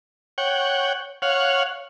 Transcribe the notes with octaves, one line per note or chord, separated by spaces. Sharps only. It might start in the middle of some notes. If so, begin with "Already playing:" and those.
C#5 F#5 G5
C#5 F5 F#5